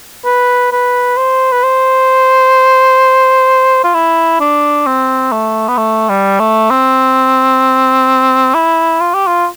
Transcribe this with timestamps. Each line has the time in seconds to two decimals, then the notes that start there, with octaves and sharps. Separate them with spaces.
0.25 B4
0.72 B4
1.17 C5
1.52 B4
1.63 C5
3.84 F4
3.94 E4
4.40 D4
4.86 C4
5.32 A3
5.68 B3
5.77 A3
6.09 G3
6.39 A3
6.70 C4
8.54 E4
9.00 F4
9.14 G4
9.27 F4